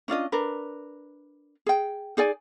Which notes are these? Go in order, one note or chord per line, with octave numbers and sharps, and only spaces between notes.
C#4 D4 F4 D#5
D4 A#4 B4
G#4 G5
D#4 G#4 D5 G#5